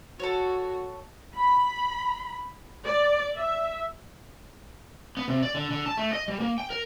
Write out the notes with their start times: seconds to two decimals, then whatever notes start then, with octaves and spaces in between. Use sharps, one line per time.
0.20 F#4 A4 C#5
1.35 B5
2.86 D5
3.37 E5
5.17 B3
5.28 C3
5.43 D5
5.54 D3
5.71 D3
5.86 A5
5.97 A3
6.13 D#5
6.28 G3
6.40 A#3
6.58 G5
6.70 A#4